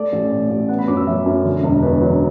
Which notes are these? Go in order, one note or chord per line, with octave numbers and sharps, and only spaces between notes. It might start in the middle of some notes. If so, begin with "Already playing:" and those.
Already playing: A3 D5
A1
A2
A1
B3 F#5
B5
F#2 D6
E6
F#3 E5
F#2
D3
E1
E2 B4
F#3